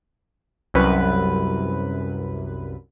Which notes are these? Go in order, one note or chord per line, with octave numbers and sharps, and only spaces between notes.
C2 F#2 B4